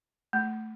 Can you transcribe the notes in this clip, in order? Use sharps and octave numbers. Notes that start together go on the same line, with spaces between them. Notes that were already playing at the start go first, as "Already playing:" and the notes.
A3